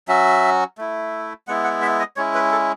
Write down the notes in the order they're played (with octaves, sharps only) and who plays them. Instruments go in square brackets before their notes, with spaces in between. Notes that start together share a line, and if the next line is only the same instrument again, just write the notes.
[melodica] F#3 C#4 F#4 E5
A3 E4
G#3 B3 E4 F#5
F#5
E5
D#5
G#3 C#4 E4 C#5
B4
A4